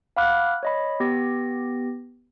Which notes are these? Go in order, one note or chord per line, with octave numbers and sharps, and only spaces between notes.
F5 F#5 B5 D6 F6 F#6
C#5 D#5 B5
B3 G4 A#6